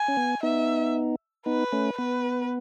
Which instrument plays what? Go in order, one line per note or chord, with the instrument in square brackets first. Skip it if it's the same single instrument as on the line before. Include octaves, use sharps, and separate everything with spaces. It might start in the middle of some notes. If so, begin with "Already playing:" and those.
Already playing: [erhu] G#5
[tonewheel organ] C#4
B3
[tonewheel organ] B3 D#4 [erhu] E5
[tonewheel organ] B3 D#4 [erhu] B4
[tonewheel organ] A3 C#4
[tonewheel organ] B3 [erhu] B4